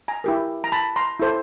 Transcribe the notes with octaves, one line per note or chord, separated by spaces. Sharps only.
G#5 A#5
E4 G4 A#4
A#5
A5 B5
A#5 C6
E4 A4 C5